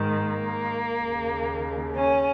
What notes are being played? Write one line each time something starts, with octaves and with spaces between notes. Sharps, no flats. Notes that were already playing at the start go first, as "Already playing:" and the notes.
Already playing: G#2 D#3
A#3
D#2 C#3
C#4